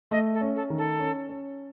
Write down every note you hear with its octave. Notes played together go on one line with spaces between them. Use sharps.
A3 D#5
A4
C#4
A4
D#3
A4
C#4
C#4